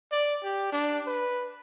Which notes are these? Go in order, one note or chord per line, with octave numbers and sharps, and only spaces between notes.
D5
G4
D4
B4